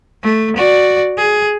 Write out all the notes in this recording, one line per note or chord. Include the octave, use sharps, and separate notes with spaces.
A3
F#4 D5
G#4